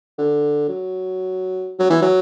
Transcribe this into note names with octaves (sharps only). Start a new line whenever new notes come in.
D3
F#3
F#3
E3
F#3